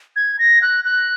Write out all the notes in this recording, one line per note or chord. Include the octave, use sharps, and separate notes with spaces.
G#6
A#6
F#6
F#6